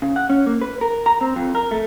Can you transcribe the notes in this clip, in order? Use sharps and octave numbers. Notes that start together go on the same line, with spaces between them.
C#3
F#5
C#4
A#3
B4
A#4
A#5
C4
F2
A#4
A3